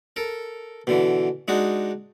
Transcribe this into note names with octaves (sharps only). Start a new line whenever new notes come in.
A4 A#4
B2 D3 E3
G#3 D4 D#4 F#4